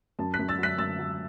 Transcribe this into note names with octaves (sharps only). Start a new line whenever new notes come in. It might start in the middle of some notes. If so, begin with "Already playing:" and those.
F#2 A5
F#6 B6
F#2
E6 A6
F#3 F#6 B6
F#2 E6 A6
F#3